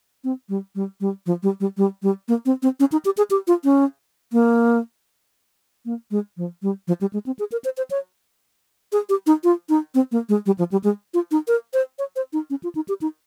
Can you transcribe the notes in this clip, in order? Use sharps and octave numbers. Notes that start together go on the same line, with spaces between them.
C4
G3
G3
G3
F3
G3
G3
G3
G3
A#3
C4
C4
C#4
D#4
G4
G#4
G4
F4
C#4
A#3
A#3
G#3
F3
G3
F3
G3
G#3
C4
G#4
A#4
C5
C5
C#5
G#4
G4
D#4
F4
D#4
C4
A#3
G#3
G3
F3
G3
G#3
F4
D#4
A#4
C5
C#5
C5
D#4
C#4
F4
D#4
G4
D#4